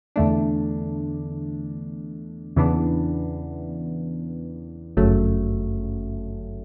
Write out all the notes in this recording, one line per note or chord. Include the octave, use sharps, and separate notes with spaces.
E2 D3 A3 D4
E2 C#3 E3 B3 D4
G1 F#2 C#3 F#3 A3